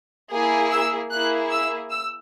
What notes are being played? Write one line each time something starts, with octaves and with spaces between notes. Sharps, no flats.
A#3 E4 G#4
E6
A#3 E4 G#4 F#6
E6
E6